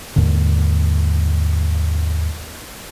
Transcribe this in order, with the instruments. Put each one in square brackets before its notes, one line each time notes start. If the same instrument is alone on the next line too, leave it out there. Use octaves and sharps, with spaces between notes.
[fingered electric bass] D#2 G#2 D3